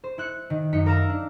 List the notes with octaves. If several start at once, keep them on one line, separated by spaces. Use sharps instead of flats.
C5
E4 F#6 C#7
D#3
F#2 D#4 B6 C#7
A#4 F5 A#5 E6
D4